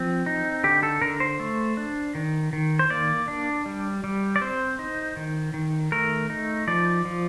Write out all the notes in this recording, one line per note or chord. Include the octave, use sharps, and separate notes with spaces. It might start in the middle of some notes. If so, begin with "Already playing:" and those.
Already playing: F3 C4
D#4
D3 G4
A4
D3 A#4
C5
A3
D4
D#3
D#3
C5
A#3 D5
D4
G3
G3
D5
C4 C5
D#4
D#3
D#3
A3 A#4
D#4
F3 D5
F3